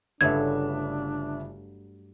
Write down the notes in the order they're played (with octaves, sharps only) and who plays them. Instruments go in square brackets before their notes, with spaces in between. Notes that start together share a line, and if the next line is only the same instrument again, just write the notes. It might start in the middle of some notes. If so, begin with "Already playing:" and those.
[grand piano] G1 C#3 E5 [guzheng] G2 F#3 A3 [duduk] D4 [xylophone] G#6